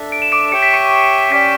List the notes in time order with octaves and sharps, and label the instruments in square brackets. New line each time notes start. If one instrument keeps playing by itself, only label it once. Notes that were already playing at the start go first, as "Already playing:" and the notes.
Already playing: [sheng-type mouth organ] D4 A4 E5
[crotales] D7
E7
D6 D7
[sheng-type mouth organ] G4 C#5 E5 G5 [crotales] C#7
[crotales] B6
C#6 C#7
[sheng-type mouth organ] C#4 G4 D5 G5 [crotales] B6